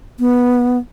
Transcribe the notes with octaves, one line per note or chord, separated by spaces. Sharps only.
B3